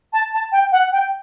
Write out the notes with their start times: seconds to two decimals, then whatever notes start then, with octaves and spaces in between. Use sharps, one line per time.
0.13 A5
0.33 A5
0.52 G5
0.72 F#5
0.92 G5